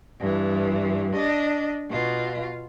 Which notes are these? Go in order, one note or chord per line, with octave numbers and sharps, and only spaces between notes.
G2 E3
D4 D#5
B2 F4